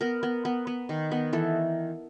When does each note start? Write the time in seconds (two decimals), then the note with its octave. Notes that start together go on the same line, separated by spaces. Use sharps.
0.01 B3 A#4
0.23 B3
0.45 B3
0.67 B3
0.89 D#3
1.12 B3
1.33 E3 A4